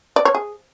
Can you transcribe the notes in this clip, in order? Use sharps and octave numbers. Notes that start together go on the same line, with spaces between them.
D5
C#5
G#4